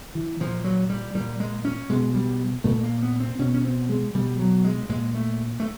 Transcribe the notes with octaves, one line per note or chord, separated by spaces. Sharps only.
E3
A#2 F3
F#3
G3
A#2 G3
G#3
C#4
B2 G#3
G3
A#2 A3
A#3
B3
C4
B2 C#4
C#4
C4
G#3
B2 G3
F#3
G#3
A#2 G#3
A3
A3